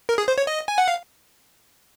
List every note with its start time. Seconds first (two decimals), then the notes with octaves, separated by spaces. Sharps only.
0.09 A#4
0.18 G#4
0.28 C5
0.38 C#5
0.47 D#5
0.68 G#5
0.78 F#5
0.88 F5